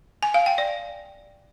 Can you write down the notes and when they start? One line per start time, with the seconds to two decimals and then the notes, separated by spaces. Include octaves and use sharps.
0.23 G#5
0.34 F5
0.46 G5
0.58 D5